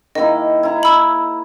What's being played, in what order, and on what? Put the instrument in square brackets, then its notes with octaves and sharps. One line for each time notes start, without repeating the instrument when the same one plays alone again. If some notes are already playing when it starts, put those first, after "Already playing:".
[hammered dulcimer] D#3 A#3 E4 [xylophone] D#5
[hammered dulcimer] E4 A#5
[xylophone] B5 E6